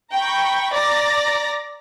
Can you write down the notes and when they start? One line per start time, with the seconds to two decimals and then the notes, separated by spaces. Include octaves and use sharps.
0.14 G5 A#5 B5 C#6
0.74 D5 A#5 A#6